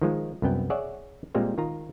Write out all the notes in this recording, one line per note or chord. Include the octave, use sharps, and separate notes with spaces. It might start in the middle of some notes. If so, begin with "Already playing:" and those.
D#3 F3 G#3
C2 F#2 B3 G5
G#4 C#5 D5 E5 F#5
A#2 G3 G#3 A#3 C4
D#3 F4 A#5